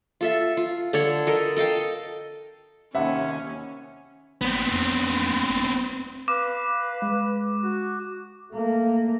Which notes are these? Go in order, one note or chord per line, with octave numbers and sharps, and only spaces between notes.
F4 A4 E5
F4
D3 A4 C#5 C#6
A4 A#4 D#5
A4 D#5 F5 G5
D#2 C3 C#4 E5 F#5 B5
G#1 B3 C4
F2
G1
B4 F5 D6
G#3
F#4
A3 A#3